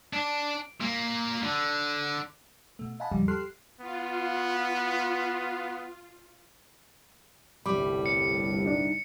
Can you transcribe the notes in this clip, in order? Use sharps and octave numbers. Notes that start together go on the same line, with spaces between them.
D4
A#2 A#3
D3
B2 A3
D#5 F5 F#5 G#5 A5 B5
E2 G#2 C#3 F3 G3
G4 A4 C6 F6 F#6 C7
B3 F4
G1 C2 A2 G3 B5 D6
C#7
D4 D#4